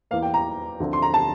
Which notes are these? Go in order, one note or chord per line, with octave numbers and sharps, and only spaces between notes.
E2 E3 A#3 F5
G5
A#5
D2 D3 F3 C4
C6
A#5
A5